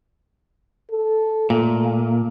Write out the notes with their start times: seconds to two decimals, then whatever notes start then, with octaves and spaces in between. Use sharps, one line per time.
0.91 A4
1.50 A#2 A3